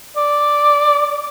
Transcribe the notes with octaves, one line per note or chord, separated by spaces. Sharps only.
D5